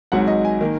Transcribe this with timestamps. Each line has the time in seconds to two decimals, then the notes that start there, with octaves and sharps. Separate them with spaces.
0.12 G#1 G#2 F#3 F#5
0.28 D#5
0.45 G#5
0.61 D#3 A#3